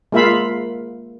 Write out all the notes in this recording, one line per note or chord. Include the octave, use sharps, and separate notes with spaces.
G#3 A#3 F4 E5 F5 B5